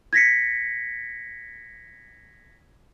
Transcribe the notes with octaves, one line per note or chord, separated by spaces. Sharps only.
G#6 A#6 B6 C#7